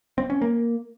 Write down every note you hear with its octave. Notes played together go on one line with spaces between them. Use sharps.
C4
C#4
A#3